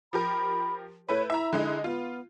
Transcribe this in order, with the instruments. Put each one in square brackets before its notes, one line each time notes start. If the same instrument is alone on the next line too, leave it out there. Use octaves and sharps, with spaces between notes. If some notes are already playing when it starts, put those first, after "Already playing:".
[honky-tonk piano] F3 G4 A#4 [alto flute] B5
[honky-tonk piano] A3 E4 B4 [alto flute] C#5
[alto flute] E4 [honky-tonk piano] E5 A#5
[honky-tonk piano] D3 G#3 D#4
[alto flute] B3 [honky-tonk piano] F4